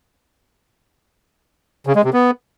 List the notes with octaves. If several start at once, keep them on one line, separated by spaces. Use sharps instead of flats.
C#3
G#3
C3
B3